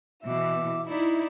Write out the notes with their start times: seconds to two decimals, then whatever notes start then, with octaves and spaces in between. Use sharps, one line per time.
0.24 B2 E3 E5 D6
0.87 D#4 E4 D5